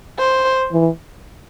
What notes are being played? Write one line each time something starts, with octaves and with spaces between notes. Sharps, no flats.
C5
E3